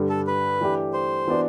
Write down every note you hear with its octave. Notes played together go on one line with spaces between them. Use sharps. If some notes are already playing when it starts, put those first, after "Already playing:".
Already playing: G2 D3 G3
A4
B4
E3 A3 D4 G4
C5
E3 B3 D4 F#4